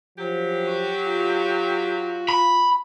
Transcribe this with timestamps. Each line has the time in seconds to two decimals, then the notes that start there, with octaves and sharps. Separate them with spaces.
0.18 F3 F#3 G4
0.67 F#4
1.05 F4
2.29 B5